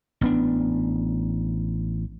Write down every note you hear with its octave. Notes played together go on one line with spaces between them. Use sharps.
A1 B3 D4